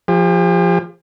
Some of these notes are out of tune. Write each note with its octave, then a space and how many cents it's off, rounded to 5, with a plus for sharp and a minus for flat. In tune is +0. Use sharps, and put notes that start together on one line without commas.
F3 +0 G4 +45